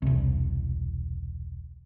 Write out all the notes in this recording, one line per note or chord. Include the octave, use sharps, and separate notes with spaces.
E1 C2